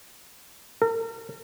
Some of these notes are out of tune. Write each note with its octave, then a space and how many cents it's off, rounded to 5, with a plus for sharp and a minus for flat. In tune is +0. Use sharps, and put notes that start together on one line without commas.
A#4 -40